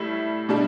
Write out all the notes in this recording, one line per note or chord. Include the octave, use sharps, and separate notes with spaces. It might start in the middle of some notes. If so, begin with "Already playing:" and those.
Already playing: A2 G3 E4
B2 G3 D4